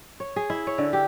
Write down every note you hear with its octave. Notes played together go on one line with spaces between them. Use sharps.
C#5
G#4
E4
C#5
D3
G4